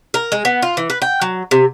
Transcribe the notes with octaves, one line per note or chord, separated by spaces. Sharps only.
A#4
G#3
B3
F4
E3
B4
G5
F#3
C3